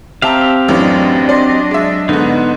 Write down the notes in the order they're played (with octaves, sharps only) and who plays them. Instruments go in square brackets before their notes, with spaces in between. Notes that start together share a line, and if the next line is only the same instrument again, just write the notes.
[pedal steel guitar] C4 G4 F5 [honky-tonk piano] E5 A5 A#5
[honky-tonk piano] A1 F#2 E3 [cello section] F#3 D4 D#5
[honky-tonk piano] D5 C6
G#3 E5
[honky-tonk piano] G#2 D3 [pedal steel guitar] B3 D#4